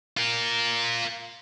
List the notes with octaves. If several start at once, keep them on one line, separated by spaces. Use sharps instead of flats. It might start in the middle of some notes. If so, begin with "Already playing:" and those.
F4 A#4